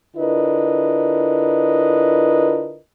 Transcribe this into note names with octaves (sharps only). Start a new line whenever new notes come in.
D3 E4 F4 A#4 B4 D#5